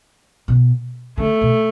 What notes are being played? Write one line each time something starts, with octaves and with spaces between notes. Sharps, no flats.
B2
D3 A3
B2